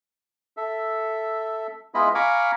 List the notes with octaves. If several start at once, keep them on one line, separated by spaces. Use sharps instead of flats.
A4 E5
G#3 B3 E4 F4 D#5 B5
F5 G#5 A#5 B5 C#6 D6